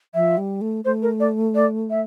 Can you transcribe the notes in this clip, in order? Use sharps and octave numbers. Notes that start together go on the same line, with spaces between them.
F3 E5
G3
A3
A3 C5
A#4
D5
D5
E5